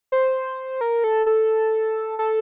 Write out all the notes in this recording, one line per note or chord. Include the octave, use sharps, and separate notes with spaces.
C5
A#4
A4
A4
A4